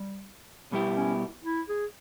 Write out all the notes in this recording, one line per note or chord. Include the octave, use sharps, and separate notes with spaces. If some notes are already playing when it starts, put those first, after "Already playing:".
Already playing: G3
B2 G3 B3 E4 G4
C#4
E4
G#4